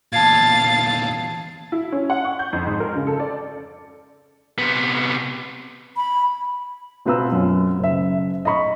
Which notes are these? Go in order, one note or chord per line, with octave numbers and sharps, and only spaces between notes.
E2 A#2 F5 A5 G#6 A6
E4
C#4
F#5
C#6
G6
F2
G#2
A#4
C#3
A4
D5
C3 B3
B5
B2 C4 F4 B4 A#5 E6
F#2
F#1 E5
D#5 A#5 B5 C#6